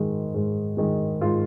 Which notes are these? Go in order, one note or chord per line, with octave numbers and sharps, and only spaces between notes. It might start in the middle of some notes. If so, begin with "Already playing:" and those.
Already playing: G#2 D#3 G#3
G#2
D#3 G#3
G#2 F4